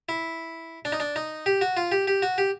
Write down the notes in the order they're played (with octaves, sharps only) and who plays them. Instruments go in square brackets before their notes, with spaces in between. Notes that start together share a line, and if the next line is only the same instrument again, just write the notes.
[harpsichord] E4
D4
D#4
D4
D#4
G4
F#4
F4
G4
G4
F#4
G4